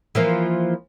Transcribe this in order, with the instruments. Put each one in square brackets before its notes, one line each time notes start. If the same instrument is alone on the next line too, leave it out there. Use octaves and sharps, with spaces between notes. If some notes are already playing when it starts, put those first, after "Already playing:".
[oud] E3 F3 A#3